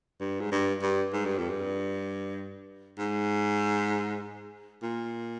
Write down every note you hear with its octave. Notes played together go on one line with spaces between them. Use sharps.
G2
G#2
G2
G2
G#2
G2
F2
G2
G#2
A#2